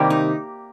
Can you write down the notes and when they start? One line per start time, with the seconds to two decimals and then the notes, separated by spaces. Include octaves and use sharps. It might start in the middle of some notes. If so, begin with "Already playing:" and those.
Already playing: C3 D#3 G3 A#3 G4
0.10 D#4